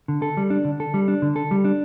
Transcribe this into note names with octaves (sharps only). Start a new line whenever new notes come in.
D3
A4
G3
D4
D3
A4
G3
D4
D3
A4
G3
D4